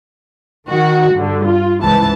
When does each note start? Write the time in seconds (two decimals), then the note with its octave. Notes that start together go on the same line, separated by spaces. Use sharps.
0.69 D#3 F#4
1.14 G2 D3
1.46 F4
1.83 C#2 G#2 E3 A5